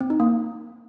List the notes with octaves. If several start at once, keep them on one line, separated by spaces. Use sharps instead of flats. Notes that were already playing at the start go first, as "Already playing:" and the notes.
C4
D#4
A#3